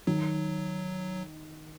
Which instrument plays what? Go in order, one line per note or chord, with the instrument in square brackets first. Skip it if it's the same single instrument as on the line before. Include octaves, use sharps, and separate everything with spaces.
[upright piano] D#3 [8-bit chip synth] F#3